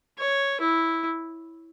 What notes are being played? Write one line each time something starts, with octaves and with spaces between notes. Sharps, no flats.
C#5
E4